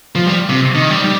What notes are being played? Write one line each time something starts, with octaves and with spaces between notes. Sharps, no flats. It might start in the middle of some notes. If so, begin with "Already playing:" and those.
F3
G3
C3
D#3
G3
G3